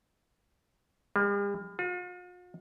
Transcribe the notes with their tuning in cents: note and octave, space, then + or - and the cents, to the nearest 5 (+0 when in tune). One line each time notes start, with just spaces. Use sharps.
G3 +45
F4 +45